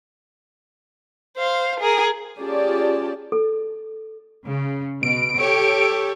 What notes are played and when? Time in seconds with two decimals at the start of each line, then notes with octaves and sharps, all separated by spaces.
1.38 C5 F5
1.80 G#4 A#4
2.39 C#4 F4 G4 G#4 D5 A5
3.32 A4
4.46 C#3
5.03 B2 D7
5.38 G4 A4 C#5